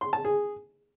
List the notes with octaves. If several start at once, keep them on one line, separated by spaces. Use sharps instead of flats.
C6
A5
G#4